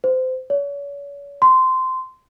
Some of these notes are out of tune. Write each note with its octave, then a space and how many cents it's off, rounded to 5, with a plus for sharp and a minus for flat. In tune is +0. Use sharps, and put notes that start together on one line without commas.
C5 -25
C#5 +40
C6 -15